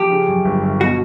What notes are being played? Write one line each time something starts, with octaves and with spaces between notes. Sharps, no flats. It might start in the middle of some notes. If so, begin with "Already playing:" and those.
Already playing: F3 G4
C#3
F#2
G1
G1
B2 F#4